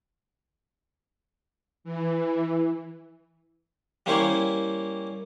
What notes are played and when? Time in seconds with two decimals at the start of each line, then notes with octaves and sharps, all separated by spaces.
1.84 E3
4.06 G3 A#3 C#4 E4 C5 C#5